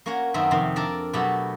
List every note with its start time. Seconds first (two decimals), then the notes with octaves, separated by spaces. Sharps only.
0.06 A#3 C#4 F#4 A#4 C#5
0.34 F#2 D#3 B3 C4 A#4 E5
0.51 F2 C3 D#3 C6
0.76 D4 A4 A#4 D5 A5
1.13 B2 F#3 A3 G4 A4 B5